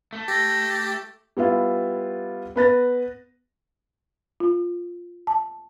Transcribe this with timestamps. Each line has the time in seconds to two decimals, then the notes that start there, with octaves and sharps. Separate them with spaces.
0.13 A3
0.28 G4 A#6
1.37 G3 B3 E4 F4
2.56 B3 B4 A6 A#6
4.40 F4
5.27 A5